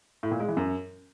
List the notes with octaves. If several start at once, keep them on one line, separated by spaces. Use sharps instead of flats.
A2
A#2
G#3
E3
F#2